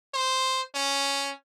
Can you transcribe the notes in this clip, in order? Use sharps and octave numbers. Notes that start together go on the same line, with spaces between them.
C5
C#4